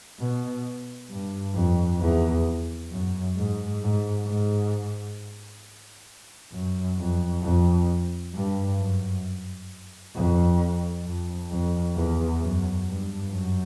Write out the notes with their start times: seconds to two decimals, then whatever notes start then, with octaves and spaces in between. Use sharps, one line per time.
0.20 B2
1.10 G2
1.55 F2
2.00 E2
2.91 F#2
3.37 G#2
3.81 G#2
4.26 G#2
6.52 F#2
6.98 F2
7.43 F2
8.34 G2
8.79 F#2
10.15 F2
11.06 F2
11.51 F2
11.95 E2
12.41 F#2
12.87 G2
13.31 F#2